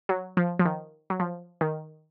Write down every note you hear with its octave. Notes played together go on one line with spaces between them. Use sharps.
F#3
F3
F3
D#3
F#3
F3
D#3